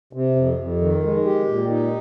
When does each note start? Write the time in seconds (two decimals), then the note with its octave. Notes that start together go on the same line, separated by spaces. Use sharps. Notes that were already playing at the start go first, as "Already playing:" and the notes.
0.13 C3
0.36 F2
0.58 F2
0.80 D#3
1.03 G#3
1.25 G4
1.48 A#2
1.70 D#4